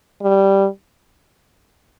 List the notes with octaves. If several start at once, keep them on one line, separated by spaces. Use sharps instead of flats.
G3